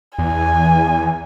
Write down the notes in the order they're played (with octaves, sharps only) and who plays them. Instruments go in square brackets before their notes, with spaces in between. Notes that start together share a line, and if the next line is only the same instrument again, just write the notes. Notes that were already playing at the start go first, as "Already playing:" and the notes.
[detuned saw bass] E2 [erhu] G#5